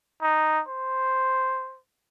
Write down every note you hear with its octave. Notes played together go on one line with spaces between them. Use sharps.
D#4
C5